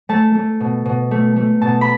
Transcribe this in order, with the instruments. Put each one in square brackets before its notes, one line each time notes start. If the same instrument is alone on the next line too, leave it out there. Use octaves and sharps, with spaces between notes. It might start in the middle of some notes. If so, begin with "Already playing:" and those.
[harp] A3 A5
A3
B2
B2
A3
A3
B2 A5
B5